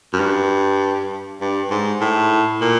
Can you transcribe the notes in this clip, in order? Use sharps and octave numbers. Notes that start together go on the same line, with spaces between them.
F#2
G2
G2
G#2
A2
A#2